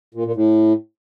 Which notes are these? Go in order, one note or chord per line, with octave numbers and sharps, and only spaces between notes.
A#2
A#2
A2